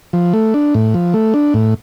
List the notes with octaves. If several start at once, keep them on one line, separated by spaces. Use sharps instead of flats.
F3
A3
D4
A2
F3
A3
D4
A2